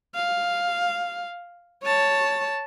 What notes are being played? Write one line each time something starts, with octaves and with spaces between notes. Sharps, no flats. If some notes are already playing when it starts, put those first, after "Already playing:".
F5
C#5 A5